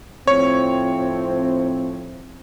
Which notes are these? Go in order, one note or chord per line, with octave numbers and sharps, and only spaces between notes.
A2 F3 C4 C#5